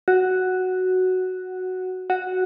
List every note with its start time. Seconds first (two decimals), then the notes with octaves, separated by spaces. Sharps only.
0.08 F#4
2.10 F#4